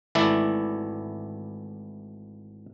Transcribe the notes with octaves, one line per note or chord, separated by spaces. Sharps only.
G#1 E3 A3 E4 D5